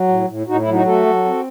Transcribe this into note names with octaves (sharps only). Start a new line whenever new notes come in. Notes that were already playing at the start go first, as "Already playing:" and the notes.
Already playing: F#3
A2
A2
A2 D#4 F#4
E4
F#3
D#4 F#4
A3 F#4 A4
F#3
C4